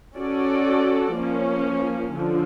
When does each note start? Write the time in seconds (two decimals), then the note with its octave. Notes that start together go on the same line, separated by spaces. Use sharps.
0.15 C#4 F#4 A4 D5
1.15 F3 A#3 C#4
2.14 D3 F3